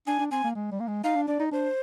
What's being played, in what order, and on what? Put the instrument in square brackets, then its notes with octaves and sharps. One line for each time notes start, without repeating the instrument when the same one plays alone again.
[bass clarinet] D4 [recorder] G#5
[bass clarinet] D4
[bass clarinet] C4 [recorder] G#5
[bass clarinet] A#3
G#3
G3
A#3
G#3
[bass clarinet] D#4 [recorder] F5
[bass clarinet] D4
[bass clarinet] D4 [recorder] D5
[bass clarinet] D#4
[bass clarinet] D4 [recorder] C5